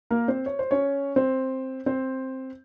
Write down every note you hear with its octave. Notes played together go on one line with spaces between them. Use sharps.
A#3 A#4
C4 C5
C#5
C5
C#4 C#5
C4 C5
C4 C5